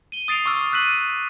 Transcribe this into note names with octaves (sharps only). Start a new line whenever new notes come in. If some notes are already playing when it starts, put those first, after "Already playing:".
D#7 G7
D#6 A6 C7 D7 F7
C#6 D6 E6 F6 D7
F6 F#6 B6 D#7 F#7